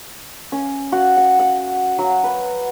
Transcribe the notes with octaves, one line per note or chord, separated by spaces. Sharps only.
C#4
F#4
F#5
F#5
F#3
B4